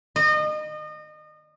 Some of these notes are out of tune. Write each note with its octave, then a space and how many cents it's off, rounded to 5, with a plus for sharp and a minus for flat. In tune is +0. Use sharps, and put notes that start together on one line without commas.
D#5 -30